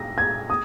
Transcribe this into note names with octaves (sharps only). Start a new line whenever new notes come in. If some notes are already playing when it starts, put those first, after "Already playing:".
Already playing: A#6
G#6
D#6